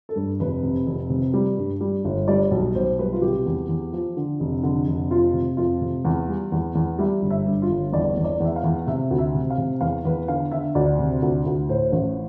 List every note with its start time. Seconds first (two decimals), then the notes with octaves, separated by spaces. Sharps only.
0.09 A4
0.16 G2
0.40 F1 B4
0.63 C3
0.86 F1
1.10 C3
1.33 G3
1.58 G2
1.81 G3
2.05 G1
2.28 G3 D5
2.51 B1
2.75 B1 C5
2.99 G3 B4
3.13 F4
3.22 C3 G4
3.46 E2
3.69 E2
3.93 F3
4.17 D3
4.40 F1
4.63 D3
4.87 F1
5.11 F3 F4
5.34 C3
5.57 F2 F4
5.81 C3
6.05 E2
6.28 G3
6.52 E2
6.75 E2
6.99 G3 E5
7.22 G1
7.30 E5
7.46 G2
7.62 F4
7.69 G1
7.93 E2 D5
8.17 E2
8.24 D5
8.40 E2
8.45 E5
8.56 F5
8.64 E2
8.87 C3 E5
9.11 D2
9.19 E5
9.35 C3
9.50 F5
9.58 C3
9.81 E2 F5
10.05 E2 B4
10.28 D3 F5
10.52 D3 E5
10.75 D2 D5
10.99 C3
11.22 D2
11.46 D2
11.69 A2 C5
11.92 A1